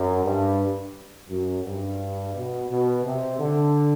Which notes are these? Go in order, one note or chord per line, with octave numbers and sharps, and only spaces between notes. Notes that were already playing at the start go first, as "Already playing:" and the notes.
Already playing: F#2
G2
F#2
G2
B2
B2
C3
D3